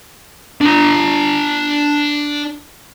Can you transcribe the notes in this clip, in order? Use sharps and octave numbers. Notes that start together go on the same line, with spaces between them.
D4 A#5